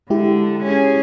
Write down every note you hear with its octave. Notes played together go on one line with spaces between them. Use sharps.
D3 G#3 E4 G4
C#4 G#4